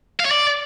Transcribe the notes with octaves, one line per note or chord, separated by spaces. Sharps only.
F5
C#5
D5